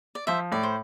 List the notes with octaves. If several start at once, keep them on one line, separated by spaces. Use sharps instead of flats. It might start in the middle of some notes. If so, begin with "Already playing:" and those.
D5
F3 C5 E5
A2 D5
C5